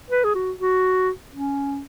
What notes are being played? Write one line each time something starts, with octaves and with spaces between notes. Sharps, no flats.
B4
G#4
F#4
F#4
C#4